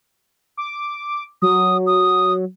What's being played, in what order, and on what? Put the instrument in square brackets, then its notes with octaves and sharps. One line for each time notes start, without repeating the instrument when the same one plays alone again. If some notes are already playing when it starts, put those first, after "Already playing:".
[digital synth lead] D6
[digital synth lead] F#3 [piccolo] D#6
[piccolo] D#6